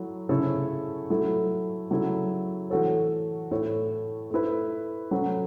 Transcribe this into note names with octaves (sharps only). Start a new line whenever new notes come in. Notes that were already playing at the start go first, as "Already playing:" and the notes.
Already playing: F#3 A3 E4
C#3 A3 E4 A4 C#5
F#3 A3 E4 A4
C#3 F#3 A3 E4 A4
E3 A3 F#4 A4 C#5
A2 A3 E4 C#5
A3 E4 B4
F#3 A3 C#4 F#4